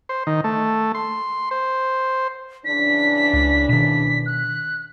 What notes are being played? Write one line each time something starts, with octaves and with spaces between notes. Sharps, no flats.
C5
D#3
A3
C6
C5
C#3 E3 D4 B6
C#2
B2 D#3 B6
F#6